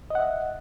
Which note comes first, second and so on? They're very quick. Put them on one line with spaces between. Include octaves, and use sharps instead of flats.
D#5 F#5 E5